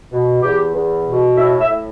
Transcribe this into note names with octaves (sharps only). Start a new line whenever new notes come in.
B2
E2 G4
E2
B2
A2 E5
E5
A2